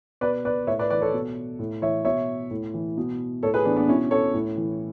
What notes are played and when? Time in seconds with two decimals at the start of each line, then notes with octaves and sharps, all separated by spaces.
0.21 B2 B4 D5
0.45 B4 D5
0.67 A2 C#5 E5
0.79 B4 D5
0.90 E3 B4 D5
1.01 A4 C#5
1.13 B2
1.59 A2
1.82 E3 C#5 E5
2.05 B2 C#5 E5
2.51 A2
2.74 E3
2.97 B2
3.43 A2 A4 C#5
3.54 G#4 B4
3.65 E3 B3 D4
3.76 B3 D4
3.88 B2 C#4 E4
4.11 A4 C#5
4.34 A2
4.57 E3